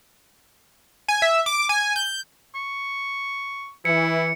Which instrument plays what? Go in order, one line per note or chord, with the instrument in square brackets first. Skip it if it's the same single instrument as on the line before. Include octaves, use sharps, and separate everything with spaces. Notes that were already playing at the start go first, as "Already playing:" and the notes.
[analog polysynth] G#5
E5
D6
G#5
G6
[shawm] C#6
[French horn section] E3 [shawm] E4 [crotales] C#7